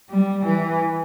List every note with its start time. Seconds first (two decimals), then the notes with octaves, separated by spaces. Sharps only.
0.10 G3
0.46 E3